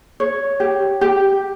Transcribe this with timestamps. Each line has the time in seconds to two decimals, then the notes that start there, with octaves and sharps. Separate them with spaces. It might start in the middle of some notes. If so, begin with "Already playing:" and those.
0.20 C#5
0.60 G4
1.01 G4